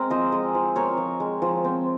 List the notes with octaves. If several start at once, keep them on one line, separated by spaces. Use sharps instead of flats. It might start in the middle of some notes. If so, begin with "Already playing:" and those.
Already playing: G#3 C4 A#4
F3 C5 D#5
G#3
F3
C4 A#4 C#5
F3
G#3
F3
C4